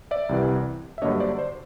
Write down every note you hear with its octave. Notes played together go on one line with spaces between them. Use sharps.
D5 E5
C2 C3 E3
E5
G2 D3 F#3 A#3 D4 C#5 D#5
C5 D5
C5